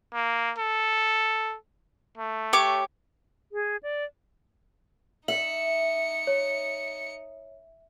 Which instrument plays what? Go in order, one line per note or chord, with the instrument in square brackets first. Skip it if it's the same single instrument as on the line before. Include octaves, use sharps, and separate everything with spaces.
[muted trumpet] A#3
A4
A3
[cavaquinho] G4 C#5 D6
[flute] G#4
D5
[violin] D#4 C#7 [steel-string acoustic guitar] E5 [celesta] F#7
[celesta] C#5